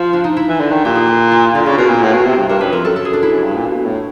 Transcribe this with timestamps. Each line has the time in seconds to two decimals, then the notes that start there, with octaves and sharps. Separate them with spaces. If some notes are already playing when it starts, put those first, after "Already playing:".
Already playing: F3
0.13 D4
0.24 D#4
0.37 E4
0.49 E3
0.60 D3
0.72 D#3
0.84 A#2 G4
0.95 G#4
1.07 G4
1.31 F4
1.54 D3 F4
1.66 C#3 F4
1.78 B2 A#4
1.90 A#2
2.02 A2
2.14 B2
2.26 C3
2.37 G2
2.49 G2 A#4
2.61 F#2 B4
2.72 F2 A#4
2.84 F#2 A4
2.96 A4
3.05 G#4
3.13 D4
3.23 E4
3.31 F#2
3.43 G2
3.55 A#2
3.66 B2
3.85 A2